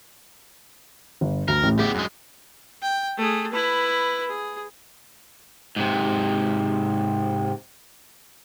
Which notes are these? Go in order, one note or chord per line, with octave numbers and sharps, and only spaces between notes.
G1
D2 A#4
A1 A2
B3 G4 G#4
F#2 G#3
G5
A3 G#4
E4 B4
G#4
G#2 C3